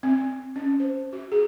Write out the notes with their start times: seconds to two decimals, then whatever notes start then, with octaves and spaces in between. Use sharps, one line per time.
0.03 C4
0.56 C#4
0.80 C5
1.13 F#4
1.32 G#4